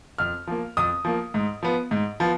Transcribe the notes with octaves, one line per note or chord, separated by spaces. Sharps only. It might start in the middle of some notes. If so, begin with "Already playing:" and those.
F2 F6
F3 A#3
F2 D#6
F3 A#3
G#2
F3 B3
G#2
F3 B3